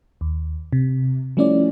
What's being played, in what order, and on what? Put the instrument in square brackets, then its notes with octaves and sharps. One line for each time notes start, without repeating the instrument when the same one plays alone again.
[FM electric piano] D#2
C3
F3 G3 A3 C#4 E4 D5